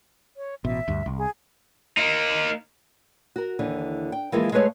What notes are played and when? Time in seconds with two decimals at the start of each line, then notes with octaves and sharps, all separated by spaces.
0.37 C#5
0.65 A1 B2 E5
0.88 D2 G2
1.06 C2
1.18 G#4
1.97 A#3 D#4
3.36 F#4 A#4
3.59 D#2 D3 E3
4.12 G5
4.32 E3 F3 G#3 A#3 E4 A#4
4.52 G#3 A3 G#4 B4 C#5 F5